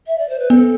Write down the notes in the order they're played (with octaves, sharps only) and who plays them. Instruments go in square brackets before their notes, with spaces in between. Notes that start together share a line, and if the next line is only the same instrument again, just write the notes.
[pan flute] E5
D5
C5
B4
[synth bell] B3 [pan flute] A4